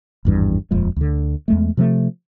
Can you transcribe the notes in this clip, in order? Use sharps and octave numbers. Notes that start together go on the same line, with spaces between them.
G#1 E2 G2
D#1 F2 F3 G#3
D2 D3
E2 G#3 A3
C3 F3 G3 A3